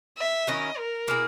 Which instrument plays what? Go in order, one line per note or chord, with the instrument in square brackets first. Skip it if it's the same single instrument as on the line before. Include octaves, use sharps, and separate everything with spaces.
[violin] E5
[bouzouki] D#3 F#3 C#4 E4 [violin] D#5
[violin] A#4
[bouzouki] B2 A#3 E4 G#4